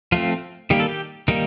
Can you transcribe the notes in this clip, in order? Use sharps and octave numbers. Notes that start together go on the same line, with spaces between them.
F3 A3 C4 F4
D#3 G3 A#3 G4
A4
G4
D#3 G3 A#3 D#4